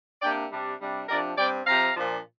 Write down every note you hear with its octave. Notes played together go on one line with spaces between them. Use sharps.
C3 A#3 D4 D5 G5
C3 G3 D4
C3 G3 D4
C3 F3 D4 A#4 D5
G2 G3 C4 D5 G5
C3 F3 C4 F5 A#5
A#2 F3 D4